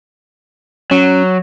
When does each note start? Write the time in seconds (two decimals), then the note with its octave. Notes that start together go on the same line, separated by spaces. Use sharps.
0.91 F#3 C#4